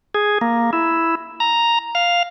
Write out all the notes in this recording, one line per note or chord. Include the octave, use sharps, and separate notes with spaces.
G#4
A#3
E4
A#5
F5